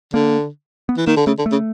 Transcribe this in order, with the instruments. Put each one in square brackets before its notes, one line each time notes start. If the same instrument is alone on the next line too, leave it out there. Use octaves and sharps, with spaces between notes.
[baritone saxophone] D3 [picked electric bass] A#3
[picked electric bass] B3
[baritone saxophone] E3
[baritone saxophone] D#3 [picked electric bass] A#3
[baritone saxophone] D3
[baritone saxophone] C#3 [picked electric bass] A3
[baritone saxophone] D3
[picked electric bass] A3
[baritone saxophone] C#3